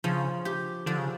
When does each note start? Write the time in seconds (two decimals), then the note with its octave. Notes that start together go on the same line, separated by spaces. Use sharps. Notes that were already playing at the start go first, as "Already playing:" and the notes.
0.04 C#3 F3
0.45 G4
0.86 D3 F3
0.98 C#3